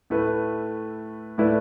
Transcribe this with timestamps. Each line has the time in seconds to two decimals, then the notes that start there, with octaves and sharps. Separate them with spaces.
0.10 A2 A3 E4 B4
1.38 A2 A3 E4 B4 D5